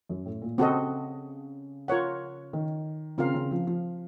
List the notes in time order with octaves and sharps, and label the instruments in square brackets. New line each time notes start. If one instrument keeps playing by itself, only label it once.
[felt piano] F#2
A2
A#2
[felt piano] C#3 [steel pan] C4 F#4 A4 D#5
[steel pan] F4 A#4 C#5 F#5
[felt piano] D#3
[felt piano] C#3 [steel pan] C4 F4 A#4 F5
[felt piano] C#3
F3
F3